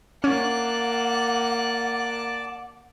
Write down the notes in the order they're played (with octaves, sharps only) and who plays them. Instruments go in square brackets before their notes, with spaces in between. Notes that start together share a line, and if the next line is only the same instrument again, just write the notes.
[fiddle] A#3 F#6 [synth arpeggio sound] C#4 [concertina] D5 A5 D6 [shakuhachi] F#5